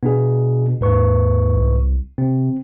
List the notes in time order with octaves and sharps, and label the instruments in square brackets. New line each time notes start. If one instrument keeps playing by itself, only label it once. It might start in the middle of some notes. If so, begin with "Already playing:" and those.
[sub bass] B2 [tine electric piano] B3 D4 G#4
[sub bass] D#2 [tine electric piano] G#2 B4 C#6
[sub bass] C2
[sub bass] C3 [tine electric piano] C4